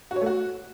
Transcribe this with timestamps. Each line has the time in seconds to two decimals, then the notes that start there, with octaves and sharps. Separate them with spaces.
0.11 F#4
0.16 C#5
0.21 A3
0.26 F#4